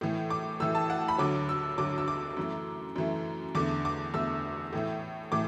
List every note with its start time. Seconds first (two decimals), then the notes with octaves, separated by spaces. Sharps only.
0.01 A2 E3 A3
0.30 D6
0.60 A2 E3 A3 E6
0.75 A5
0.90 F#5
1.08 B5
1.18 D2 D3 F#3 D6
1.49 E6
1.78 D2 D3 F#3 D6
1.98 E6
2.08 D6
2.37 F#2 E3 A3
2.96 F#2 E3 A3
3.55 E2 D3 A3 D6
3.85 D6
4.14 E2 D3 A3 E6
4.73 A2 E3 A3
5.32 A2 E3 A3 D6